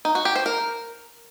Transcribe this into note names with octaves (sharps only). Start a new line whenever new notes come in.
D#4
F#4
G4
C5
A#4